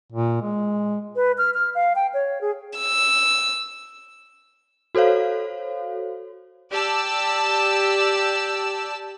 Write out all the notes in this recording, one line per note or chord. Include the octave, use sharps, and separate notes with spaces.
A#2
G#3
B4
F6
F6
F5
G5
C#5
G#4
E6
F#4 A4 C5 C#5 F5
G4 D5 A5 E6